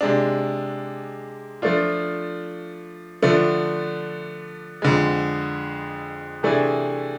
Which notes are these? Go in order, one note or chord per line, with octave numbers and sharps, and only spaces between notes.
C3 G#3 D4
F3 A3 D4 F4
D3 F3 A3 D4
F2 D3 G#3
C3 E3 A3 D4 G#4